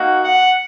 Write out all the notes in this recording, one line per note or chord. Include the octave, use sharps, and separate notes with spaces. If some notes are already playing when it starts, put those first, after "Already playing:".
Already playing: A#3 D#4 F#4
F#5